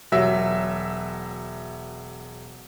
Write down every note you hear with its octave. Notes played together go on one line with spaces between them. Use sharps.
E1 F#3 E5